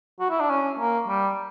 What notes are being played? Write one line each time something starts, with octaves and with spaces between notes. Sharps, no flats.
F#4
E4
D4
C#4
A#3
G3